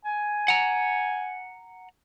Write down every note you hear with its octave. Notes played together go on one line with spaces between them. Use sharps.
G#5
F#5 A#5